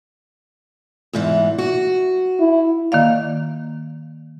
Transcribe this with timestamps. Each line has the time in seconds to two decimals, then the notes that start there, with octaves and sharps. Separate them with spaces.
1.13 E2 G#2 E3
1.58 F#4
2.39 E4
2.92 D#3 A#3 D5 F5